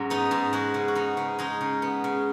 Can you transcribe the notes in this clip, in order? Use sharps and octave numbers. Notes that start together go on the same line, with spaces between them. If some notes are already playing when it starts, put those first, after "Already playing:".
Already playing: G#2 F#3 C#4
B3 D#4
G#2
G#3 F#4
C#3
F#4
B3 D#4
C#3
G#3 D#4
C#3
B3
C#3